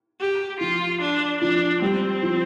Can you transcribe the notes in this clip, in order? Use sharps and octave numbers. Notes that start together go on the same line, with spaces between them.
G4
F3 F4
D4
F3 D4
G3 C4
F3